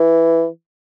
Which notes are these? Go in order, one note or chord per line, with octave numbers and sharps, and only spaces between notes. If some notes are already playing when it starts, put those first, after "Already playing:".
Already playing: E3